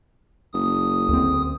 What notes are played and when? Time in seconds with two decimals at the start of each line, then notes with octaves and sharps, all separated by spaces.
0.54 F#1 D#6
1.09 D2 C4